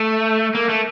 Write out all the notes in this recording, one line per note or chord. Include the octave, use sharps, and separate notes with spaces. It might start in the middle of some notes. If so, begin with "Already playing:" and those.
Already playing: A3
A#3
A3